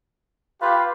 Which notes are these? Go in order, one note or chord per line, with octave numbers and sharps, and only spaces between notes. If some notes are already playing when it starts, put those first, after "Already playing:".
F4 G4 B4 F5